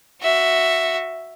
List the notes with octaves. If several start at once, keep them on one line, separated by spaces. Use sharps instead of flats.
F#4 E5